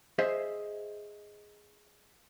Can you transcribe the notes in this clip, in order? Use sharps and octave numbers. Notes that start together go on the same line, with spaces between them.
G#4 C5 D#5 E5